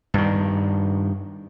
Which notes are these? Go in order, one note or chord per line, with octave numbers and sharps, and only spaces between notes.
G2 D#3